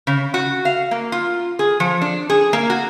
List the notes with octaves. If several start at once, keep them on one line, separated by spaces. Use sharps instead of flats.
C#3
F#4
F5
A#3
F4
G#4
F3
D4
G#4
A#3
F#4